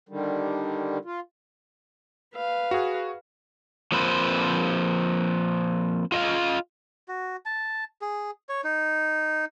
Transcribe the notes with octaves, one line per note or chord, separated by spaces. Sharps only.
D3 D#3 G3
F4
B4 F5
F#4 G#4
F3 A#3 C4 B4 C5
F4 D#5 F5
F#4
A5
G#4
C#5
D#4